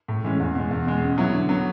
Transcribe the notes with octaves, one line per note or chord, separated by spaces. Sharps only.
A2
E3 G#3 C#4
E2
B2 G#3
E2
B2 G#3
C#3
F#3 B3 E4
D3
F#3 B3